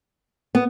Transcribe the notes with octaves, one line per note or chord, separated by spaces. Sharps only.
B3